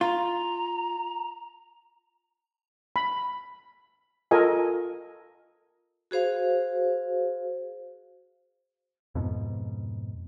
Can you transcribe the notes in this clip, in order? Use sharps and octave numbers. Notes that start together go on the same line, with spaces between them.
F4 A#5
B5
F4 A4 A#4 D#5 G#5
F#4 G#4 C5 F5
F2 G#2 B2